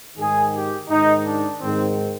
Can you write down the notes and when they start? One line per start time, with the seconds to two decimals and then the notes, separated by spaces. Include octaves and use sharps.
0.18 G#2 D#3 G#4
0.54 G4
0.89 G#2 D#3 D#4
1.25 D4
1.60 G#2 D#3 C4